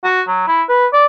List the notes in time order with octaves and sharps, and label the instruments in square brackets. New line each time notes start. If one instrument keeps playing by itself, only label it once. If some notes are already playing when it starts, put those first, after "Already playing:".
[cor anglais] F#4
F#3
E4
B4
D5